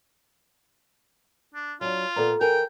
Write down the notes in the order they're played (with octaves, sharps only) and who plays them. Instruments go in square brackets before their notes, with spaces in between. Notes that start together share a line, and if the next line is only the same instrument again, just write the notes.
[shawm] D4
[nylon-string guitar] F#3 D4 [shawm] F4
[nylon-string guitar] A#2 B3 D5 [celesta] A4 A#5
[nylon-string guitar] E3 G#4 A#4 [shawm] G5